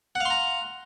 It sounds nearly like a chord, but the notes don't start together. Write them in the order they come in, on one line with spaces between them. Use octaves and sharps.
F#5 F5 C6 A#5